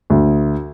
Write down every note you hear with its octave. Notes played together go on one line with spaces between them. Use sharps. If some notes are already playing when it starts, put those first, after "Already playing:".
D2